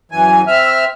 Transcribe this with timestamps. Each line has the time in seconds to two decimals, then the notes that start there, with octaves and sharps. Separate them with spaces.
0.12 F#2 E3 G#5
0.47 C4 E5 F6